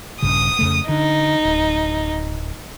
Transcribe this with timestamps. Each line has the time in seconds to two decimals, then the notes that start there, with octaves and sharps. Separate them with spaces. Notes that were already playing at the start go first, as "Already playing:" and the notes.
0.22 A#1 G2 C#3 D#6
0.59 F2 C#3 A3
0.89 D3 D#4
1.45 D1